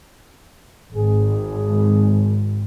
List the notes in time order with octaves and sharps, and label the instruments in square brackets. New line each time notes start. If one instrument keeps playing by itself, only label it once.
[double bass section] G#1 [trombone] G#4